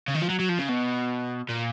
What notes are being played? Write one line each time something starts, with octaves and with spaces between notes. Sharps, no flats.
C#3
D#3
F3
F#3
F#3
F3
C#3
B2
A#2